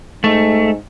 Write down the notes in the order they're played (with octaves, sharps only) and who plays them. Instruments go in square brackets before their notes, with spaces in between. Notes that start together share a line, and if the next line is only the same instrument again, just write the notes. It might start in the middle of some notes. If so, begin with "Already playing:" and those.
[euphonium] G#2 [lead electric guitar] A3